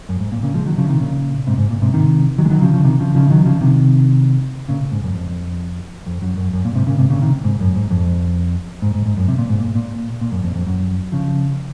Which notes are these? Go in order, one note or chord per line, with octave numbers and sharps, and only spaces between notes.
F#2
G#2
A#2
A#2 C#3
F3 G#3
D#3 F#3
C#3 F3
C3 D#3
A#2 C#3
G#2 C3
G#2
A#2
G#2 C3
C3 D#3
D#3 F#3
G#3
D#3 F#3
C#3 F3
C#3 F3
C3 D#3
C#3 F3
C#3 F3
D#3 F#3
C#3 F3
C3 D#3
A#2 C#3
G#2
F#2
F2
F2
F#2
F#2
F#2
A#2
G#2 C3
A#2 C#3
G#2 C3
A#2 C#3
C3 D#3
G#2
F#2
G#2
F2
G#2
G#2
G#2
F#2
C3
A#2
G#2
A#2
A#2
A#2
F#2
F2
F2
F#2
C#3 F3